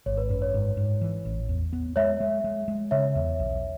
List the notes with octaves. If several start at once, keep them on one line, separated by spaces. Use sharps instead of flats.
G#1 C#5
B4
F#2 B4
C#5
G#2
G#2
E3
A1
E2
B3
G#3 C#5 E5
G#3
G#3
G#3
C#3 C#5 E5
E2
B1